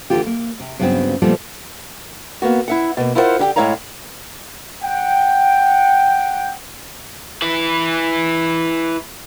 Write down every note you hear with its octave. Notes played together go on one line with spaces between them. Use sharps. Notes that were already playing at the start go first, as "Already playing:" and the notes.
D3 E3 A3 F4 G4
A#3
C3
G2 C#3 F#3 B3 C4 B4
A#2 F3 G3 A3 B3 C4
A#3 B3 F#4
E4 E5 F#5
B2 A#3
E4 F4 A#4 C5 D5 F#5
D3 E4 G4 G5
A2 G#3 E4 C#5 F5 A#5
F#5 G5
E4 B4